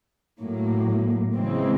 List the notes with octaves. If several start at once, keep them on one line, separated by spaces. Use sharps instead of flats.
A2 F#3 A#3
C#3 E3 G#3 C4